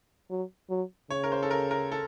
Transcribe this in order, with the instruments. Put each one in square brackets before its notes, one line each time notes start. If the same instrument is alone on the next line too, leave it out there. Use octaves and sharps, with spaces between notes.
[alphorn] F#3
F#3
[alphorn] C#3 [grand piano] C#5
[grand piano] A#4
C5
A4
A#4
A#4
A4